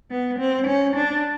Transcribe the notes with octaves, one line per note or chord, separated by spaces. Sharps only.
B3
C4
C#4
D4